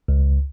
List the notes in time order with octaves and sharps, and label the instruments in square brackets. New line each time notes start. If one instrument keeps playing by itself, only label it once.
[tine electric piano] C#2